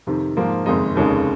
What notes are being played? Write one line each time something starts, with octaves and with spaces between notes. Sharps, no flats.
F2 C3 D#3
G#2 F3 A#3
F#1 F2 D#3 G#3 D#4
F1 D#2 C#3 G#3 D#4